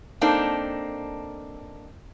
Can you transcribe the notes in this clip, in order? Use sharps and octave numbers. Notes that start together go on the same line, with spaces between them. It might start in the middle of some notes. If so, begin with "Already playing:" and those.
A#3 C4 D4 D#4 A4